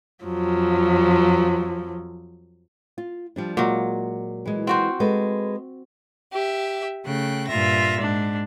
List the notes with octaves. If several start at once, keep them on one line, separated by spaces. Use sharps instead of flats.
F2 F3 F#3
F4
F3 G3 D4
A#2 F#3 G#3
E3 G#3
C4 F#4 C5
G#3 A4 B4
G4 E5
C#3 A3 G5 F#6
G2 A#2 F4 E5 A#6
G#2 D4